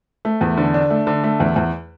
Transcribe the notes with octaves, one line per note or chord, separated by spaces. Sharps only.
A3
E2
D3
D4
A3
D3
A3
E2
E2